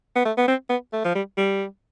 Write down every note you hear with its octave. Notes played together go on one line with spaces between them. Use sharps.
B3
A3
B3
C4
B3
A3
F3
G3
G3